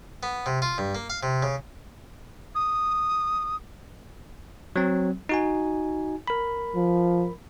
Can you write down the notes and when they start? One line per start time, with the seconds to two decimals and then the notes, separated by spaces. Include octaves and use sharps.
0.23 B3
0.46 C3
0.62 F4
0.78 G2
0.95 A#3
1.10 F5
1.23 C3
1.43 C#3
2.55 D#6
4.76 F#3 C4
5.29 D#4 F#4 G#5
6.28 A#4 B5
6.75 F3